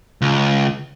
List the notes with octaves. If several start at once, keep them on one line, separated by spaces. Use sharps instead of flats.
C#2